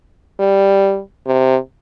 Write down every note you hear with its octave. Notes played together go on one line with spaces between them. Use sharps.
G3
C3